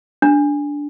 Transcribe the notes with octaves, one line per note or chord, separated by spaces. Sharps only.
D4